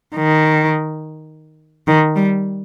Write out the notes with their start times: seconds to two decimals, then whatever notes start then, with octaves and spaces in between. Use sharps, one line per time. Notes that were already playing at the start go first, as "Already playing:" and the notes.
0.16 D#3
1.87 D#3
2.16 G3